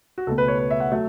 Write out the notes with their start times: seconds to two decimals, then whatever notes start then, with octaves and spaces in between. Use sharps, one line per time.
0.18 F#4
0.27 C#2 B2 A3 A4
0.38 B4
0.48 C#5
0.59 B4
0.70 E5
0.80 F#5
0.92 F#3 A3 E5